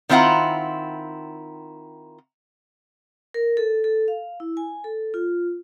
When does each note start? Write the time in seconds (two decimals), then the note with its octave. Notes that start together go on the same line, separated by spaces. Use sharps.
0.09 D#3 C4 E4 F4 F#5 A#5
3.34 A#4
3.57 A4
3.84 A4
4.08 F5
4.40 E4
4.57 G#5
4.84 A4
5.14 F4